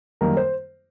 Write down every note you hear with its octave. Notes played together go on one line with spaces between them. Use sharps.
F#2 D#3 G3 A#3 A#4
C5